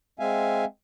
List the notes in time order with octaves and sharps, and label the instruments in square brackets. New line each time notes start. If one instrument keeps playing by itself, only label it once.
[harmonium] G#3 C4 E5 F5 G#5